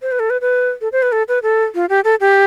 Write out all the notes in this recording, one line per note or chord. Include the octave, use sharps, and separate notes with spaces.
C5
B4
A4
B4
B4
A4
C5
B4
A4
B4
A4
F4
G4
A4
G4